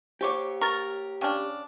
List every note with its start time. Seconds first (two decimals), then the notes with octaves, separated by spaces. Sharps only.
0.21 G4 C5 C#5 C#6 D6
0.61 A#4 C#6 A6
1.21 C#3 D4 G5 C#6 F6